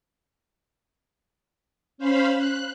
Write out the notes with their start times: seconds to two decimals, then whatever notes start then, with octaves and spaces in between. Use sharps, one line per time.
1.98 C#4 C5 F5 B5
2.36 F#6